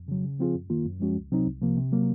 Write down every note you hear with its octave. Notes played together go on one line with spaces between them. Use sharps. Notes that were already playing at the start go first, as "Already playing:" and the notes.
Already playing: F2
C#3 F#3
C#3
F3 C4 F4 G#4
F#2
D#3 A#3 F4
F#2
F3 G#3 C#4 F#4
C#2
C3 F#3 C4 D#4
C2
C3 F3 A#3
C3
F#3 A#3